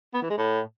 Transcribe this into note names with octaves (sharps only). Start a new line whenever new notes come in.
B3
E3
G#3
A2